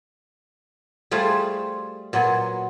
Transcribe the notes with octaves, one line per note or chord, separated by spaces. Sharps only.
G3 A3 F4 G#4 C5
A#2 F#3 B3 G#5